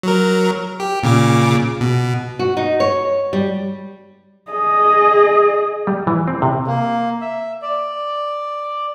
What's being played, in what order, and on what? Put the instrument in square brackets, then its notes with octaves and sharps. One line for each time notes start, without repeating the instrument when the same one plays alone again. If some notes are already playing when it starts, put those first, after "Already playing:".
[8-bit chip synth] F#3 A#4
G4
A#2 C#3 D6
B2
[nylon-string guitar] F#4
D#4
C#5
G3
[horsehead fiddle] G#4 D#5
[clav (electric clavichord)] G3
E3
C4
C3
[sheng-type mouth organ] A#3
E5
D5